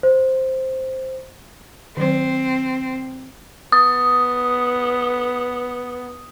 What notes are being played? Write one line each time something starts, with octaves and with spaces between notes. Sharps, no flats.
C5
D#3 F#3 C4 C5
B3 D#6